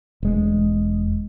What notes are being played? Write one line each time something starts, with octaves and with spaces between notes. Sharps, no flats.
E1 G#3